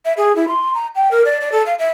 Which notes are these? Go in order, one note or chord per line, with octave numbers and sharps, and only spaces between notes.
E5
G#4
E4
C6
A#5
G5
A#4
D5
D5
A4
F5
E5